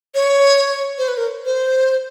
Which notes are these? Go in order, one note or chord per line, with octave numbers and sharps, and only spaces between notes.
C#5
C5
B4
A#4
C5